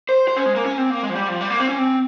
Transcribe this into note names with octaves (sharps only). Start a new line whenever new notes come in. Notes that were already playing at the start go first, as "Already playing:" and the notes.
C5
C5
C#4
G#3
A#3
C#4
C4
A#3
G#3
F3
G3
F3
G3
A#3
C4
C#4
C4